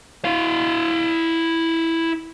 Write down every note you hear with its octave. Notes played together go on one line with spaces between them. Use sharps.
E4 F5